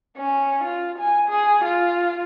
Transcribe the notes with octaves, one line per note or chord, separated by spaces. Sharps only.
C#4
F4
G#5
G#4
F4